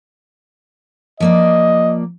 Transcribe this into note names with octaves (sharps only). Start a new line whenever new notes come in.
F3 A#3 D5 D#5